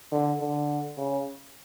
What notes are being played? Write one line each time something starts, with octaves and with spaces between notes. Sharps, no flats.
D3
D3
C#3